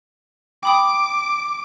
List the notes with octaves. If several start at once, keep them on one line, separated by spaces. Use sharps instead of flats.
G5 B5 D6 D#6